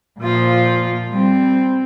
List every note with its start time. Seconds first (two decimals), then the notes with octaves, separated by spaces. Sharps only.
0.20 A#2 F3 F4
1.08 G3 C4